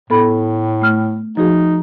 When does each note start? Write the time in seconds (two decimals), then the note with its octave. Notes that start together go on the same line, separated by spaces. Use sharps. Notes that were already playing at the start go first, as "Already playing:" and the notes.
0.10 A2 B3 A4 B5
0.82 A3 F6
1.37 F3 D#4 F#4 G#4